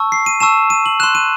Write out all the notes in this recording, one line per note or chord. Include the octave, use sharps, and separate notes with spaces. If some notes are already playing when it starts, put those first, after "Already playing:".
Already playing: A5 C#6 E6
C7
D#7
A5 C#6 E6 E7
D#7
F#7
C6 F#6 E7
D#7